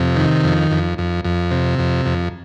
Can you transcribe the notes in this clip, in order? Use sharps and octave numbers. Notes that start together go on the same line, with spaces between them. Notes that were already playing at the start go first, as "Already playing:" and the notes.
Already playing: F2 C3
D#3
F2
F2
F2
F2
C3
F2
F2